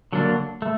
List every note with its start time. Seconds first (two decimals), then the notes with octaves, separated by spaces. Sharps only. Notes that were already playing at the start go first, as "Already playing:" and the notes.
0.12 D3 F#3 A#3 D4
0.62 A3